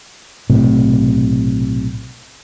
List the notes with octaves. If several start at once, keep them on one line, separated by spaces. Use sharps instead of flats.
B1 A2 C3